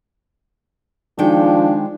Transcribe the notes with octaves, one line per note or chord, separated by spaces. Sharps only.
D#3 F3 G#3 D4 G5